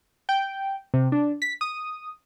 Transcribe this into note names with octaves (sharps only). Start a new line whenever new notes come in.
G5
C3
D4
B6
D#6